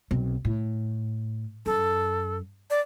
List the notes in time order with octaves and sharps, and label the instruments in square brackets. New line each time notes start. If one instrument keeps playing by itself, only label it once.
[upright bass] B1 C4
A2
[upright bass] F#2 [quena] A4
[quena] D5